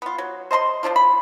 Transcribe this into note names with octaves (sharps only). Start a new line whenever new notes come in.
B3 F4
F#3
C5 D#5 A#5 C6
F3 C#4 D4 F4
B5